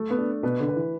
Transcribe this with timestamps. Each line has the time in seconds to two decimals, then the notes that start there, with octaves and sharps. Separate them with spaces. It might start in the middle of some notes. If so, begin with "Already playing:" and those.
Already playing: A3
0.10 B3
0.18 D4
0.43 B2 B4
0.60 D3
0.68 B4
0.76 E3